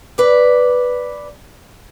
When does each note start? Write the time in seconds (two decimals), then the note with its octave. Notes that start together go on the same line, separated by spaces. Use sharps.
0.18 B4 D5